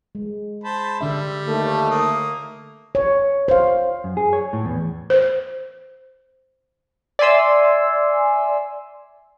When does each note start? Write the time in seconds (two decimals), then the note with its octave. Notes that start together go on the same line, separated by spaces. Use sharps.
0.15 G#3
0.64 C5 A5 B5
1.01 D3 G3 D4 E5
1.47 D#2 A3
1.90 A#3 D#6
2.95 C#5
3.48 C5 F5
4.04 F#2
4.17 G#4
4.33 C#5
4.53 A2
4.65 E2
5.10 C5
7.19 D5 E5 G#5 C6 E6